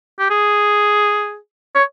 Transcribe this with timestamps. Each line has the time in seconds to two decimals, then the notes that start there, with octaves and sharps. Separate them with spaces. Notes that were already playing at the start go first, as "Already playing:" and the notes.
0.19 G4
0.30 G#4
1.75 C#5